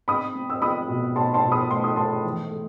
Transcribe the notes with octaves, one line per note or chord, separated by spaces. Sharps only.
C4 B5 D#6
C4
E6
C4 B5 D#6
B2
B2 A5 C6
A5 C6
B2
B5 D#6
A3 C6
D#6
A3 A5 C6
E3
A3